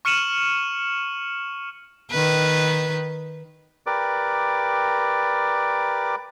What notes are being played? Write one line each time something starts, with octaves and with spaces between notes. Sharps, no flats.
C#6 F6 C#7 D#7 E7 F#7
D#3 B4
G4 A#4 B4 D5 D6